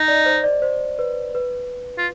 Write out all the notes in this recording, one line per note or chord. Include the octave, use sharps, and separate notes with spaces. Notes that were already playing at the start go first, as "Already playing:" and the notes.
Already playing: D#4 D#5
D5
C5
D5
C5
B4
B4
F4